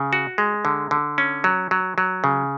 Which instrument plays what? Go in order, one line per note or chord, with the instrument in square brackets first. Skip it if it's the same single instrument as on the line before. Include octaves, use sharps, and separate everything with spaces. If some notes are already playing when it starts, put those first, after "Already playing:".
Already playing: [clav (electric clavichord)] C#3
F#4
G#3
D3
D3
C#4
F#3
F#3
F#3
C#3